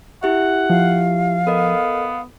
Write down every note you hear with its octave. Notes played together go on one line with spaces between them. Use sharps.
E4 G4 E5 F#5
F3 F5
B3 A4 A#4 D#5